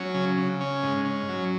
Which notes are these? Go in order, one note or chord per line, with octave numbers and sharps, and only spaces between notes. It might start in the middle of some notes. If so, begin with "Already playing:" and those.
Already playing: F#3 C#4
C#3
C#3
C#4
G#2
C#4
F#3